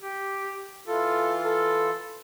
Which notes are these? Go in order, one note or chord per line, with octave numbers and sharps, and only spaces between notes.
G4
E3 F4 A4
A4